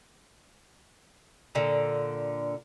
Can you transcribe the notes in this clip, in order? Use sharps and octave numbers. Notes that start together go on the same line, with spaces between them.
A#2 D3